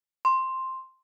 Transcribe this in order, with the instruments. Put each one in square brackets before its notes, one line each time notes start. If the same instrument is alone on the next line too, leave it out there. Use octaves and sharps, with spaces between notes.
[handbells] C6